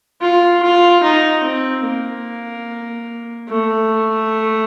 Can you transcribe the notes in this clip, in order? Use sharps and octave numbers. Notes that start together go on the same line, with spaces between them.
F4
F4
D#4
C4
A#3
A3